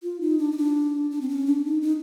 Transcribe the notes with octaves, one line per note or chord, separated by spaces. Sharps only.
F4
D#4
D4
D#4
D4
D4
C4
C#4
D4
D#4
D#4